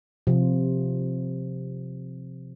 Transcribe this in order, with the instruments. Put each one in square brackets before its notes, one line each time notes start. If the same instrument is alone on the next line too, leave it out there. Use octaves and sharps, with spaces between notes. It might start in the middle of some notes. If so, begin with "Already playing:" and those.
[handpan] C3 F3